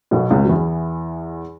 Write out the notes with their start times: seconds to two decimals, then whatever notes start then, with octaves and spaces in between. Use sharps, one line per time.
0.11 B1 B2
0.30 C#2 C#3
0.45 F#3
0.49 E2 E3